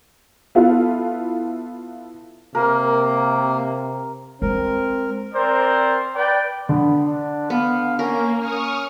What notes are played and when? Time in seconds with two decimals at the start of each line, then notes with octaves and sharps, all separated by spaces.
0.55 B3 E4 F4 A4 B4 F5
2.55 C3 A#3 A#4
4.42 G#3 C4 A#4
5.34 C4 A#4 C5 D5
6.15 B4 D5 G5
6.69 D3 B3
7.06 D4
7.50 B3 F5
7.99 A#3 C#4 A#4
8.38 C#4 C#6 D#6 F6